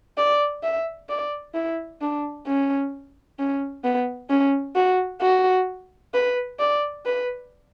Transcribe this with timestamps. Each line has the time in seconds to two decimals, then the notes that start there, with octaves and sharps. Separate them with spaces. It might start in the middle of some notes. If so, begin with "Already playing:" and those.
0.17 D5
0.63 E5
1.09 D5
1.55 E4
2.01 D4
2.47 C#4
3.39 C#4
3.84 B3
4.30 C#4
4.76 F#4
5.22 F#4
6.14 B4
6.60 D5
7.06 B4